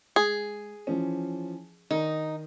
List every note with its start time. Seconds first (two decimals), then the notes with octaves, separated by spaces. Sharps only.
0.16 G#3 G#4
0.87 E3 F3 C#4
1.91 D#3 D#4